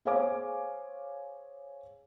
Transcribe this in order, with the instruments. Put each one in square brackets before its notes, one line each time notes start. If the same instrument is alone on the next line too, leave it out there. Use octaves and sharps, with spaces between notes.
[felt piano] G#4 C5 C#5 F5 G#5 D6